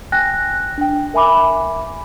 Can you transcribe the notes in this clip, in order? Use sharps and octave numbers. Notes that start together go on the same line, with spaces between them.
G5 G#5 F#6 A#6
D4 G5
A#4 E5 G#5 B5 D6